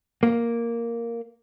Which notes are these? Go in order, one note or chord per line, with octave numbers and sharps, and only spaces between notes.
A#3